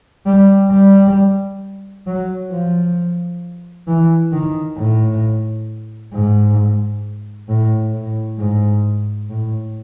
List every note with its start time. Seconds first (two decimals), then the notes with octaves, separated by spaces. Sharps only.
0.26 G3
0.71 G3
2.07 F#3
2.51 F3
3.88 E3
4.33 D#3
4.78 A2
6.14 G#2
7.49 A2
7.93 A2
8.39 G#2
9.30 A2